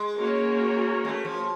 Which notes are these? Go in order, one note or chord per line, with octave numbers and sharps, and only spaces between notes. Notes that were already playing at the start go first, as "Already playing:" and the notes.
Already playing: G#3
A#3 C#4 F#4 A#4 C#5
G#3
A3
F3